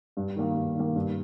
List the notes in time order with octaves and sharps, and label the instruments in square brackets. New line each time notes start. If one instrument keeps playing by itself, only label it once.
[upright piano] G2
D#3 A#3
G2
D#3 A#3
G2